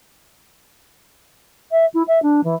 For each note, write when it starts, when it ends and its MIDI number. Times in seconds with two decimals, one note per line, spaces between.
1.71 1.86 76
1.94 2.03 64
2.08 2.22 76
2.22 2.44 62
2.44 2.55 52